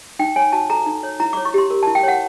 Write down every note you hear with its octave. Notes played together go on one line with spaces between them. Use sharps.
D#4 G5
C#5 G#5
F#4 A5
A4 A#5
D#4
C#5
E4 A#5
D6
C#5
C#6
G4 C6
A#4
A5
E4
G5
C#5 F#5